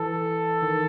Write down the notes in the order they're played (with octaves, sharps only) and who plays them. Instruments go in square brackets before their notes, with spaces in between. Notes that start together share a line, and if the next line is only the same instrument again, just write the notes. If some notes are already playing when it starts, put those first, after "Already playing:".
Already playing: [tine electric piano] E3 [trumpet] A4
[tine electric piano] D#3